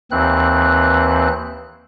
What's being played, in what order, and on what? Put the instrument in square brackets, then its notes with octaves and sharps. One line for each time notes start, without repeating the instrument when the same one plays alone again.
[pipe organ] D#2 E3 C4 F#6